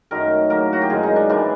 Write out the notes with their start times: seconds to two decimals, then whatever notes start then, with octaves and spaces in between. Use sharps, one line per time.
0.11 F#2 D#3 F#3 A3 A#4
0.50 A2 F#3 A#3 A#4
0.73 F#4
0.82 G4
0.90 F#2 D#3 G#3 G#4
1.03 D#4
1.16 D4
1.29 A2 E3 G#3 D4